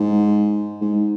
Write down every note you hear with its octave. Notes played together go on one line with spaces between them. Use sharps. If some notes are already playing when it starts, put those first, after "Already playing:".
Already playing: G#2
G#2